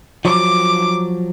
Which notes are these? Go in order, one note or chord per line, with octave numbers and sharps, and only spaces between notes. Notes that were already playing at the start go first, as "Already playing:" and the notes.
F3 F#3 D6